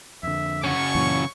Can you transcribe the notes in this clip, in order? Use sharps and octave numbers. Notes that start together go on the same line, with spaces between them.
F2 D3 E5
C#3 F#4 C#5 C#6
F#2 A#2 E3